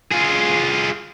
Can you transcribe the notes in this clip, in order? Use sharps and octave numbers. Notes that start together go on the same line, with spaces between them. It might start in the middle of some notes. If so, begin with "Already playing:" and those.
F4 G#4